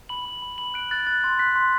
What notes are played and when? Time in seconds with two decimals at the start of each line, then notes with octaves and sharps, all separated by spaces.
0.09 B5 F#7
0.25 B5
0.42 B5
0.58 B5 F#7
0.74 F#6 D7
0.91 F#6 A6
1.07 F#6 A6
1.24 C6 A6
1.39 F#6 B6
1.56 C6